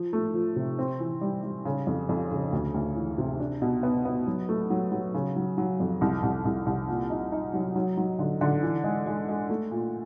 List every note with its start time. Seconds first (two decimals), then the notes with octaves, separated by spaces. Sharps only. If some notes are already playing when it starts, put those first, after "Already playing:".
Already playing: F3
0.13 A3
0.34 F3
0.56 C3
0.79 C4
1.00 E3
1.21 G3
1.43 G3
1.65 C#3
1.87 F2
2.09 F2
2.31 C#3
2.53 D2
2.74 D2
2.96 E3
3.18 C3
3.40 D4
3.62 B2
3.83 B3
4.05 B3
4.27 F#3
4.49 A3
4.70 F#3
4.92 F#3
5.14 C#3
5.36 F#3
5.58 F#3
5.80 F2
6.01 C2
6.23 C2
6.45 C2
6.66 C2
6.88 A#2
7.10 D#4
7.32 D#4
7.53 F#3
7.76 F#3
7.97 F#3
8.19 D3
8.41 D3
8.63 E3
8.84 G#3
9.06 G#3
9.29 G#3
9.50 A3
9.71 A#2